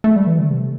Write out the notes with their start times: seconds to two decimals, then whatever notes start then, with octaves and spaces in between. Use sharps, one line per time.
0.04 A3
0.16 G3
0.27 E3
0.39 D3
0.50 C3